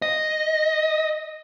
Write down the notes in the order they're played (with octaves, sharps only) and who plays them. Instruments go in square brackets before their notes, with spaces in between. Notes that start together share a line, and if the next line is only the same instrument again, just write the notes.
[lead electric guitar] D#5